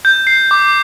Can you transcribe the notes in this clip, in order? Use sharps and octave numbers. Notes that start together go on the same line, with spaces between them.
G6
C7
D6